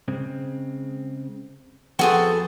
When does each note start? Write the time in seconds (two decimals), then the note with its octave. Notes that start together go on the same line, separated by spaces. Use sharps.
0.08 C#3 G#3 C4
1.99 F2 F3 B3 F#4 G#4 A4 C5 G5